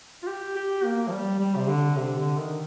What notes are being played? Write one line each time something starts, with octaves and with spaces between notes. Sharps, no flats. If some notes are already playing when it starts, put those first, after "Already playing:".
F4
G4
G4
A#3
F3
G3
G3
C3
D3
C3
D3
D#3